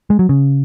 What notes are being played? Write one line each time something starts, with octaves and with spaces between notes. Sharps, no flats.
G#3
F#3
C#3